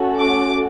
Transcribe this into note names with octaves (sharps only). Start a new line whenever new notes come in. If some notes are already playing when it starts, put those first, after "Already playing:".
Already playing: A3 C#4 F#4 A4
D6